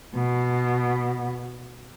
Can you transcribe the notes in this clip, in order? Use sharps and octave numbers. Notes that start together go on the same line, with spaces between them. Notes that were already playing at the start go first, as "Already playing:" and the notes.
B2